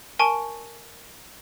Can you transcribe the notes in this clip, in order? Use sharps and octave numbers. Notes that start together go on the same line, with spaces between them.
A#4 G#5 A5 C#6 D7 G7